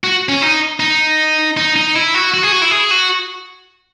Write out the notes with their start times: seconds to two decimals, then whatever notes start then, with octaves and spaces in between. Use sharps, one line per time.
0.04 F#4
0.29 C#4
0.42 D#4
0.80 D#4
1.57 D#4
1.76 D#4
1.96 E4
2.14 F#4
2.34 F#4
2.43 G#4
2.52 F#4
2.62 E4
2.71 G#4
2.91 F#4